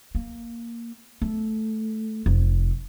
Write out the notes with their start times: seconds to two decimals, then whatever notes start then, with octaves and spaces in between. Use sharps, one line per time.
0.15 A#3
1.22 A3
2.26 F1